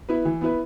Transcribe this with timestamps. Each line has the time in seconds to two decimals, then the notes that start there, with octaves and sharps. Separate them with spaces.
0.09 B3 E4 B4
0.25 E3
0.41 B3 E4 B4